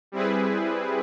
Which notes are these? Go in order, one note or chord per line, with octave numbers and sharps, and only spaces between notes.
G3 C4 E4 G#4 B4